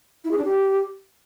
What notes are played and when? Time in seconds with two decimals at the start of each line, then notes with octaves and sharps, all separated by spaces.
0.24 E4
0.31 G#4
0.38 D4
0.45 G4